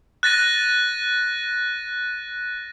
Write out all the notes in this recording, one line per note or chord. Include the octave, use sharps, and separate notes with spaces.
F#6 A6 A#6 D#7